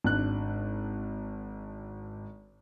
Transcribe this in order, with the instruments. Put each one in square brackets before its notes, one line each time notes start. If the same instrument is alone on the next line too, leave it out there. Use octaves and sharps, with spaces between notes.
[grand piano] G#1 D4 F#6